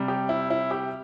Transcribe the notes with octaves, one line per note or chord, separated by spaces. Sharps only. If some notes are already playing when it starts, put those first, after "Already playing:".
Already playing: C3 G3
G4
E4
E4
G4